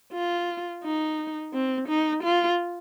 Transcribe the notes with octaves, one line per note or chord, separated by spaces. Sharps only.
F4
D#4
C4
D#4
F4